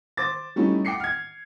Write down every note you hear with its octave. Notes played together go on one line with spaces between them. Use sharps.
C5 D6 A6
G3 A3 C#4 D#4 E4
F#5 G5 D6 C7 C#7
F6 G#6